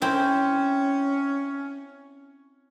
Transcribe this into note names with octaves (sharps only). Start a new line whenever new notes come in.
C4 C#4 E4